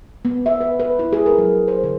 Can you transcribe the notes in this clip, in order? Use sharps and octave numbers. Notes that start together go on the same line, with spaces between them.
B3
E5
B4
B4
E4
G#4
A#4
F#3
C5
D3